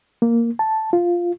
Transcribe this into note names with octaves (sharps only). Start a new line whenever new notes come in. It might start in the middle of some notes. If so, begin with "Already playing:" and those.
A#3
A5
F4